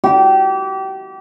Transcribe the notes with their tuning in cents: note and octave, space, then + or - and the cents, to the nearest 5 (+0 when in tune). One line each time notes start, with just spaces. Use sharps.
G4 -30